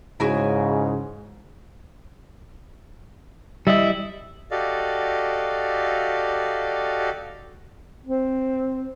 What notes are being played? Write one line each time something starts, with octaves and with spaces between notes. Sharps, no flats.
G#2 C#3 E4 F#4 G#4
G3 E4 D#5
F#4 G4 A4 D5 D#5 F5
C4